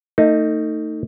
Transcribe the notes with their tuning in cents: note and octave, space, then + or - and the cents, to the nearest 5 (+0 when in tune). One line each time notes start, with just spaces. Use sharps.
A3 +35 D#4 +0